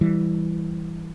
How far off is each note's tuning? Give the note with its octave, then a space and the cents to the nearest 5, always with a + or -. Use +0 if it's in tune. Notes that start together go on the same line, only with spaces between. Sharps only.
E3 +0 G3 +0